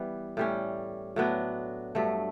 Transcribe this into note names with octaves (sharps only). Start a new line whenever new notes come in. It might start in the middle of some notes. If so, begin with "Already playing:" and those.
Already playing: E3 G3 B3
A2 G3 C#4
A2 F#3 B3 D4
G2 F#3 A3